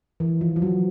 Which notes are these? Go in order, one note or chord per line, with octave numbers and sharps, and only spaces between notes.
E3
F3
F3
F#3